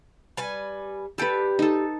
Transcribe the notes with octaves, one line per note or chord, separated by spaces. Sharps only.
G3 B4 G#5
G3 G4 A4 B4
D#4 A4